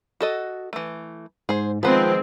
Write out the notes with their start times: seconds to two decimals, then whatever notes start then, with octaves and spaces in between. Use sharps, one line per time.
0.21 F#4 A4 D#5
0.73 E3 A3
1.49 G#2 G#4 C5
1.83 D#3 F3 G#3 B3 C4 B4 C5